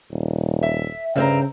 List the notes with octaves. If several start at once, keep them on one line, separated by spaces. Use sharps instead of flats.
D#1
E5
G2 C#3 C4 A#5